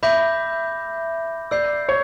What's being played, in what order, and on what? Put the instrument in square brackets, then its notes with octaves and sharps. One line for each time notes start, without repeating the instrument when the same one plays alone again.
[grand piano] E5 [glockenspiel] B5 D6 G6 A#6
[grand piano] D5 [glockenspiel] E6 G6 C7
[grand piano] C#5